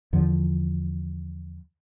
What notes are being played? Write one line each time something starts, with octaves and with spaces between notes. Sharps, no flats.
E2 D3 F3